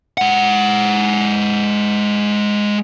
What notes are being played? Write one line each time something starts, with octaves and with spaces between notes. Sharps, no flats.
G#3 F#5